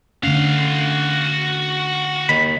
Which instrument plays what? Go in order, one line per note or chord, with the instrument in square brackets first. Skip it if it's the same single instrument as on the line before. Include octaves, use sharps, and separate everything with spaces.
[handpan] D3 A3 C#4 [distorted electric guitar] F#4 F5
[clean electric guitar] D#2 D#3 B5